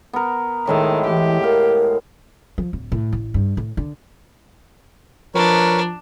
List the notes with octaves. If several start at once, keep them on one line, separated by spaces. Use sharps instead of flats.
B3 A#4
A2 D#3 G#3 E5
E3 G4
A#4 F5
F3
D1
A2
A1
G2
A2
D3
F3 D4 A#4 B4 C#5